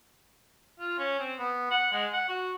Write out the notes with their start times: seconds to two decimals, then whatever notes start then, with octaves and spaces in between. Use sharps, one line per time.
0.79 F4
0.98 C#4
1.19 C4
1.39 B3
1.71 F#5
1.92 G#3
2.13 F#5
2.29 F#4